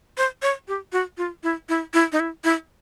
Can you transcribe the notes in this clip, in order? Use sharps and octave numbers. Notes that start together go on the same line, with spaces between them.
C5
C#5
G4
F#4
F4
E4
E4
E4
D#4
E4
E4